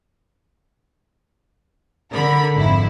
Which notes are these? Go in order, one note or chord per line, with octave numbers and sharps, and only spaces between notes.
D3 A#4 B5
G#1 F2 E4